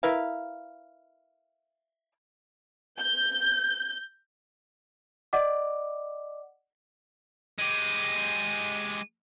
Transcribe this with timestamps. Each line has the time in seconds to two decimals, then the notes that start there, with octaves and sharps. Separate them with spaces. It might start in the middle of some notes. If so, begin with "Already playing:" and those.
0.03 E4 A#4 B4 F5
2.99 G6
5.33 D5 D#5 F#5 D6
7.58 G#3 G4 D#7